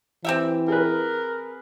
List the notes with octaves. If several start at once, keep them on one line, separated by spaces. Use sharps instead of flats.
E3 C4 G4 E5
G#4 A#4 B4